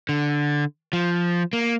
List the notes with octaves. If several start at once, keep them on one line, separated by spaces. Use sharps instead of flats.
D3
F3
A#3